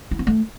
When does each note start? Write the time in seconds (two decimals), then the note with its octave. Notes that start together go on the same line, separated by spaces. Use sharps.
0.11 E4
0.19 C4
0.27 A3